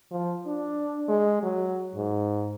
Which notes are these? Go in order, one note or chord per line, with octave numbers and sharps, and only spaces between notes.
F3
D4
G#3
F#3
G#2